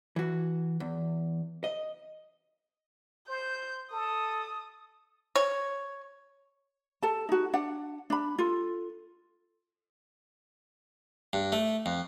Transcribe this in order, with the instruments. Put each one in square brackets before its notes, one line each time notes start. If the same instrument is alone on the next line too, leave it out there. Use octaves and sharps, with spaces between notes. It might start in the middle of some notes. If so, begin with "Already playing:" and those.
[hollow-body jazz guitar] E3 F#4
E2
D#5
[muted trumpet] C5 [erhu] G6
[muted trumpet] A4 [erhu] D#6
[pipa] C#5
[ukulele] A4 A5
D#4 F#4
D4 F#5
D4 B5
F4 A4
[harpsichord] G2
A3
F2